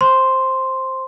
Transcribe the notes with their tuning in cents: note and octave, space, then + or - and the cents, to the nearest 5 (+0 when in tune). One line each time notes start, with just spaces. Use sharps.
C5 +10 C6 +0